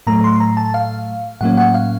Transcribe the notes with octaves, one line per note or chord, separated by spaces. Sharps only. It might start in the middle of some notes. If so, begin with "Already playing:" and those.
A2 F#3 A3 A#5
C6
A#5
A5
F5
A2 F#3 A#3 C#4 F#5
F#5
F5